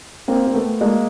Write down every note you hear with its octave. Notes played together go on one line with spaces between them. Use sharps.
A#3 C4
A#3
A3 B3
G#3 A#3